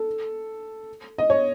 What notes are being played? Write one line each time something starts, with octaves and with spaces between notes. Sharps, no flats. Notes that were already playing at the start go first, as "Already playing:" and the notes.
Already playing: A4
D#5
C#5